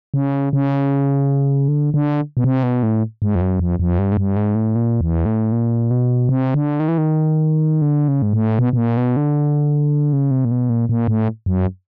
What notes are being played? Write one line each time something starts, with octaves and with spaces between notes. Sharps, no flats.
C#3
C#3
D3
D3
B2
C3
B2
A2
G#2
F2
F#2
F2
F2
G2
G#2
G2
G#2
A2
A#2
E2
A2
A#2
B2
C3
D3
D#3
E3
D#3
D3
C#3
G#2
A2
B2
B2
A#2
B2
D3
C#3
C3
A#2
B2
A#2
A#2
A2
F#2